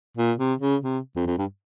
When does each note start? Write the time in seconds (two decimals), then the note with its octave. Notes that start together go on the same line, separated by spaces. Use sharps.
0.17 A#2
0.38 C3
0.61 C#3
0.83 C3
1.16 F2
1.26 F2
1.38 G2